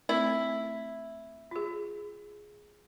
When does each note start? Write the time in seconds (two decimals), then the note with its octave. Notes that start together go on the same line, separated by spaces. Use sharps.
0.09 A3 C4 E4
1.51 F4 G#4